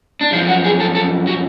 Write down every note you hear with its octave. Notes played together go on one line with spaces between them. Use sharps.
D4
F#2 F3 F4
F#4
G#4
A4
A4
F#4